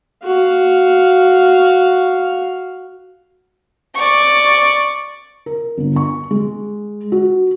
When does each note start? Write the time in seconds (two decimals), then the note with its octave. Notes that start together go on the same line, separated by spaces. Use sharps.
0.24 F#4 F5
3.95 D5 C#6
5.46 A#4
5.78 G1
5.96 C#6
6.31 G#3
7.12 F#4